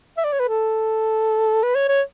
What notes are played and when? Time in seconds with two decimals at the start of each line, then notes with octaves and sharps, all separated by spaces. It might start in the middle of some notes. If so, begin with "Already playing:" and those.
0.17 E5
0.24 D5
0.33 C#5
0.39 B4
0.48 A4
1.63 B4
1.75 C#5
1.89 C#5